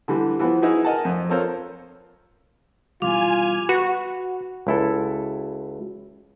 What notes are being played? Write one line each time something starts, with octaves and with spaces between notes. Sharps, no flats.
D3 E3 G3
E3 F3 B3
D#4 E4 F#4 G#4 B4
A#4 D#5 F#5 G#5 A5
F2
C4 F4 A4 A#4 C5 C#5
B2 E3 G3 F4 G#5 D6 F7
F#4 B4
C#2 E4 A4